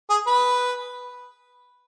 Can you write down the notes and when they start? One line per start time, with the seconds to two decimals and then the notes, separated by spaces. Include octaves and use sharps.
0.10 G#4
0.27 B4